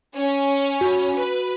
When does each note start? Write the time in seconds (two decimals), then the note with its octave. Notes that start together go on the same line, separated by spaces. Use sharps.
0.14 C#4
0.81 F#4
1.16 B4